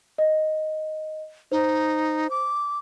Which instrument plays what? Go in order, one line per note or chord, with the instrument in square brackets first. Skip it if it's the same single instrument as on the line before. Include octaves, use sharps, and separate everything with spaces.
[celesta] D#5
[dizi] D#4 [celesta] C5
[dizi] D6